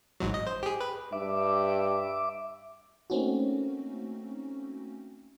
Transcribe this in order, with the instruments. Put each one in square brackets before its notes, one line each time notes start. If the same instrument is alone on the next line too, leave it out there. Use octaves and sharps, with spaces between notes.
[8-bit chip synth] A1 G#2 F#3
D#5
C5
G4 G#4
B4
[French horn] G2 [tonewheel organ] E5 D6
[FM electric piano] A3 A#3 C4 C#4 D#4 F#4